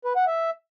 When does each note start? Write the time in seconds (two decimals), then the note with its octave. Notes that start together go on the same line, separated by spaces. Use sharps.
0.05 B4
0.16 F#5
0.27 E5